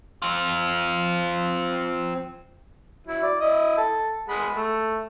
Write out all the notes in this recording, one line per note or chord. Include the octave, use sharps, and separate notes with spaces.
C4 F4
F#3 E4
D5
E4 D#5
A4
G#3 F#5 B5
A3